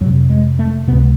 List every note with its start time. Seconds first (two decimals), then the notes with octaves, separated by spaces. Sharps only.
0.01 F2 F#3
0.06 C3
0.30 G#3
0.59 A3
0.88 C#2 C3 B3